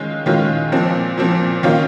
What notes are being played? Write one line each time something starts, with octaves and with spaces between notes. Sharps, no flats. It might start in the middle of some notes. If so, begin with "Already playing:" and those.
Already playing: D#3 G#3 C#4 F4
D#3 G#3 C#4 F4
A#2 F3 C4
A#2 F3 C4
D#3 A#3 C#4 F4